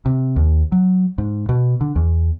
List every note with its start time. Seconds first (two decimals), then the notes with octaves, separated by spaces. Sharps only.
0.06 C3
0.36 D#2
0.72 F#3
1.18 G#2
1.49 B2
1.81 D3
1.96 E2